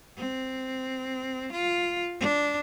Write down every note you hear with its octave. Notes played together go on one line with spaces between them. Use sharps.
C4
F4
D4